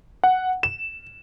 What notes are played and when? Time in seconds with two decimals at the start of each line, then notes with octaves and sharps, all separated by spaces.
0.24 F#5
0.63 E7